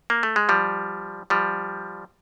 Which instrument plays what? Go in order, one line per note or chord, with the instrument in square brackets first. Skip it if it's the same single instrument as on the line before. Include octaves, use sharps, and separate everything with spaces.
[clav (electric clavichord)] A#3
A3
G#3
F3 G3
F3 G3